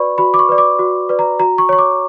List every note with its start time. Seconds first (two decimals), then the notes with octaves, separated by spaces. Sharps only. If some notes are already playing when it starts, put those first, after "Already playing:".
Already playing: F#4 B4 D5 B5 C#6
0.18 F#4 B5
0.34 D6
0.39 C#6
0.49 B4 D5
0.58 D6
0.79 F#4
1.09 B4 D5
1.19 A#5
1.39 F#4 A#5
1.58 C#6
1.69 C#5 C#6
1.78 D6